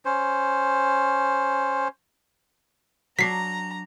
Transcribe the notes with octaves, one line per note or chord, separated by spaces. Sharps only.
C#4 C5
F#3 D4 A#5 B6 C7